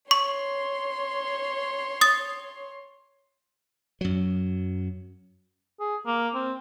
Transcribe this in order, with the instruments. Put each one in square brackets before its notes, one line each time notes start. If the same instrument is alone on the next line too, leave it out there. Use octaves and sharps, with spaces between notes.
[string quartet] C#5 C6 [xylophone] C#6
[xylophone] D#6 A6
[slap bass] F#2 F#3
[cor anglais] G#4
A#3
C4